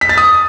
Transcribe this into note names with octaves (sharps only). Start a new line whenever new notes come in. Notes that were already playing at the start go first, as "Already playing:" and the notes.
B6
A6
D#6